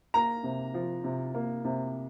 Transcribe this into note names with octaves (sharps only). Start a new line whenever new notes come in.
A#3 A#5
C3
F3
C3
A#3
C3